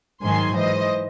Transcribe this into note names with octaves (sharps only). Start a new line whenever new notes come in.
G#2 D#3 F#3 G#5 C6
G#2 E3 C5 D#5